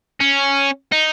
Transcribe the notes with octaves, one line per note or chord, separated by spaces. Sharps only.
C#4
D#4